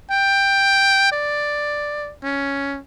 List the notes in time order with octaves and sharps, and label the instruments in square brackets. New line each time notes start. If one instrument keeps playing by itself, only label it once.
[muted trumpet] G5
D5
C#4